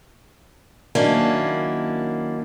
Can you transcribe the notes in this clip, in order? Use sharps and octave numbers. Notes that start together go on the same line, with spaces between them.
D#3 F#3 A#3 C#4 D4 E4